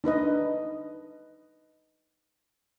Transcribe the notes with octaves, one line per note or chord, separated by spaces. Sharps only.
D4 D#4 B4 D#5